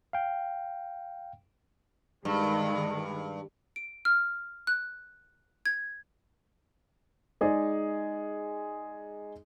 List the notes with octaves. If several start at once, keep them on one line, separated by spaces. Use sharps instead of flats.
F5 G5
G2 D#3 G#3
D7
F6
F#6
G#6
G#3 D#4 G#4 D5